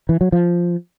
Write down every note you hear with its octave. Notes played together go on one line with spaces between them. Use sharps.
E3
F#3
F3